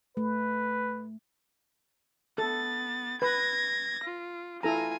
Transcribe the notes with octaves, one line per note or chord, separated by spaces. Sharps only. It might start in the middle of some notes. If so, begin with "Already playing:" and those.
A3 B4
B3 A4 A6
B4 G#6 A#6
F4
E4 F4 A4 G#5 A#5